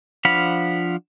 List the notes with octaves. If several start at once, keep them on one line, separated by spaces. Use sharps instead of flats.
F3 D4 F5 F#5 B5